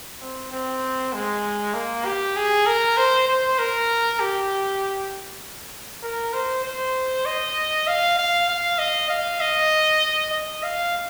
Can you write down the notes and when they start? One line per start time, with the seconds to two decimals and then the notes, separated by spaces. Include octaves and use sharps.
0.21 C4
0.52 C4
1.13 G#3
1.74 A#3
2.05 G4
2.36 G#4
2.66 A#4
2.97 C5
3.28 C5
3.58 A#4
4.20 G4
6.03 A#4
6.33 C5
6.64 C5
7.26 D#5
7.87 F5
8.18 F5
8.48 F5
8.78 D#5
9.09 F5
9.41 D#5
10.32 D#5
10.63 F5